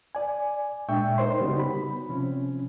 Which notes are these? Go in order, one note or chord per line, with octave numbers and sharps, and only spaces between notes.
D5 G#5
A#2 G#3 D4 E5 G5 C#6
D#4 A#4 C5 C#5 C6
C#3 G3 B3 D#4 F#4
B5
C3 F3 C4 C#4